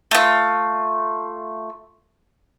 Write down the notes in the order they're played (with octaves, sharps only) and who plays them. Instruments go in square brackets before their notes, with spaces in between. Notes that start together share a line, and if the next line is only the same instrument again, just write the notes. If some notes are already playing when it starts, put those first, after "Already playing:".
[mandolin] A3 F4